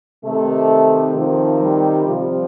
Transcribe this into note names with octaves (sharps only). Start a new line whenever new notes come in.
C3 D#3 A3
C3 D#3 F3
G3
C3 F3 G3